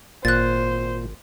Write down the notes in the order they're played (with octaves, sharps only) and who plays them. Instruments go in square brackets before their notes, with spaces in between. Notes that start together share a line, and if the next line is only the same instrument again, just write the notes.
[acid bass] G#1 [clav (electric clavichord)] A#2 [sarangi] C5 [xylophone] F#6 A6